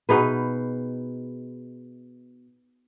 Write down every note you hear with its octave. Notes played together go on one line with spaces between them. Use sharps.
B2 D#4 G#4 B4